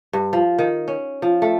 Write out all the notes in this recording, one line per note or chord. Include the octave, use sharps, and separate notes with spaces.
G2
F3
D#3
C#4
F3
A3